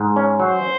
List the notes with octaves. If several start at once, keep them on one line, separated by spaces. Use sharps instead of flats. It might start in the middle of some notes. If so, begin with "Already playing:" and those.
Already playing: G#2
C#4
F#3 C5